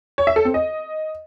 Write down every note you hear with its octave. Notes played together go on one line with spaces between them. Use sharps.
C#5
E5
A4
C4
D#5